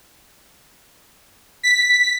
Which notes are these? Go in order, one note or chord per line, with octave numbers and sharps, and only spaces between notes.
B6